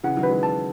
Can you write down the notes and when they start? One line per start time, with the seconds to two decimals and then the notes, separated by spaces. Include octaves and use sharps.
0.03 C#3 E3 F#5
0.17 D#3 F#3
0.23 B4
0.29 E3 G#3
0.43 A5